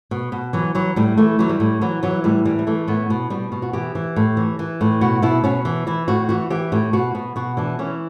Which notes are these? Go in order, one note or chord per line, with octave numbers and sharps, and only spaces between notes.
B2
B2
E3 F#3
E3 F#3
A2 G3
E3 A3
E3 F#3
G3
A2
E3 F#3
E3 F#3
A2 G3
E3 G3
G3
E3 A3
A2 B3
B2
B2 G3
B2
F#4
E3 G4
E3
A2
E3
E3
A2
B2 F#4
B2 E4
B2 C#4
E3
E3 E4
A2 F#4
E3 F#4
E3 G4
A2 G4
B2 F#4
B2
B2 F#4
E3 D4
E3 C#4